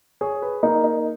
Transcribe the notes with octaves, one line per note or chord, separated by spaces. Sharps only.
G#4 C#5
B4
A#3 D#4
D#4